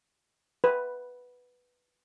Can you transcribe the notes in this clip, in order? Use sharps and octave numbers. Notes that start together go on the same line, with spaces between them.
B4